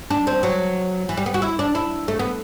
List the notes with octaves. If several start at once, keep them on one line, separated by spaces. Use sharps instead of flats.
D4
C4
F#3
E3
G3
B3
F#4
E4
D4
E4
A3
B3